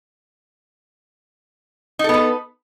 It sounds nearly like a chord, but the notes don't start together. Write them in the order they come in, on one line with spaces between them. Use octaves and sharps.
D#4 A4 B3 B4